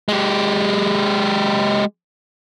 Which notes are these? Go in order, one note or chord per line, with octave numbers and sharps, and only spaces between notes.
G#3 G4